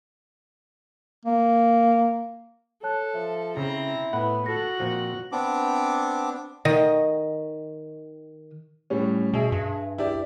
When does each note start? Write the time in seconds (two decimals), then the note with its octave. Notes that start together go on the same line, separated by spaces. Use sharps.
1.25 A#3
2.83 A4 C#5 A5 F#6
3.14 F3 E5
3.57 C#3 C4 E4 A#5
4.13 A2 B3 F#5 B5
4.46 F#4 A4 A#6
4.80 A#2 F3 C4
5.32 B3 C4 D4 D6
6.65 D#3 D#5
8.90 A2 G3 C#4
9.34 B2 G#4 E5
9.52 G2
9.98 E4 G4 D5